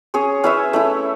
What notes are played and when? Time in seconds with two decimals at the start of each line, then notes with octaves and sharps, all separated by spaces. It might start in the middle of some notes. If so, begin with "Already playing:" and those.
0.14 C#4 G#4 C#5
0.44 C#4 E4 B4 E5
0.73 A3 C#4 E4